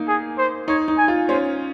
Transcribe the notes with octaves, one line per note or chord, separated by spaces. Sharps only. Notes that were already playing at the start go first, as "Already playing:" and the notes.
Already playing: A#3 D#4
G#4
C5
D#4 C#5
D#4
G#5
F4
C#4 C5